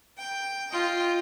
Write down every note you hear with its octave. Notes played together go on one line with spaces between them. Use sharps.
G5
F4 D#5 G5